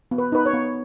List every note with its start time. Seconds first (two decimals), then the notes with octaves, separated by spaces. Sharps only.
0.11 B3
0.18 B4
0.32 D#4 B4
0.46 C#5
0.53 B3